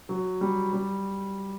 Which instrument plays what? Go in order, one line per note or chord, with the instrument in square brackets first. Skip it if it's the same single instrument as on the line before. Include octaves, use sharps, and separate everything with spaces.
[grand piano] F#3
G3
G3